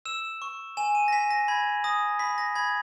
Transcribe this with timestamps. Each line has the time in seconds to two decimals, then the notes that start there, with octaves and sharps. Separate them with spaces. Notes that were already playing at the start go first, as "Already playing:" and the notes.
0.05 E6 E7
0.42 C#6
0.77 G#5 E7
0.95 D#7
1.08 A#6
1.12 G#5 B6
1.31 A#6
1.48 B5 G#6
1.84 D#6 A#6
2.19 B5 B6
2.38 A#6
2.55 B5 G#6